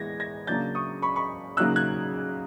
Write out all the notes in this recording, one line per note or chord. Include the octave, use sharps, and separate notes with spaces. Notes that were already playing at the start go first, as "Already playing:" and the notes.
Already playing: E3 G#3 B3 G#6 A#6
G#6 A#6
C#3 F#3 A#3 D4 G6 A6
C#6 D#6
B5 C#6
B5 C#6
C#3 F#3 A#3 D#4 E6 F#6
F#6 G#6